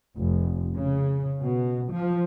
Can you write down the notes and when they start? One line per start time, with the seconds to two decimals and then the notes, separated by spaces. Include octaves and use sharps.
0.17 F1
0.76 C#3
1.40 B2
1.93 F3